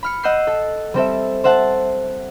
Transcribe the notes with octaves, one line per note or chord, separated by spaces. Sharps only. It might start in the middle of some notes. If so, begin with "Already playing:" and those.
B5 F6 C#7
D#5 F#5 E6 G6 C7
A4
G3 C4 A4 E5
C5 E5 F#5 A5 F#6